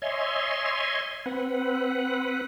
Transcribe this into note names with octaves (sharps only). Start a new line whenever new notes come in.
C#5 D#5 E5 G#5 C6
C4 B4 F#5